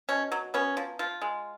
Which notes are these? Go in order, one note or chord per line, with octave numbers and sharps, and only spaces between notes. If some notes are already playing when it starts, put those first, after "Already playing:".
B2 C#4
F#3
B3 C#4
F3
F3 F4
G#3